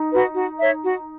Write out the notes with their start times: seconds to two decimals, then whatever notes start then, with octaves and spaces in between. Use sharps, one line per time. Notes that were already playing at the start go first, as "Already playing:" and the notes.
Already playing: D#4
0.11 F#4 B4
0.35 F#4
0.59 C#5 E5
0.84 F#4